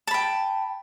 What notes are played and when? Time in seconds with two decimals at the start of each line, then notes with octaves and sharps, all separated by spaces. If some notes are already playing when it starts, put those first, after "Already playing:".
0.07 A5
0.11 B5
0.14 G5